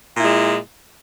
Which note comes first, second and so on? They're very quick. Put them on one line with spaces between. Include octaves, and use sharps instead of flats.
A#2 E4 G#3